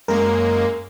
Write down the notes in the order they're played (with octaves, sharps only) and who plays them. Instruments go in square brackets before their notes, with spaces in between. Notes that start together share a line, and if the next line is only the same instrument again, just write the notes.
[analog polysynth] F#2 G#3 A#3 [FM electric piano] A#4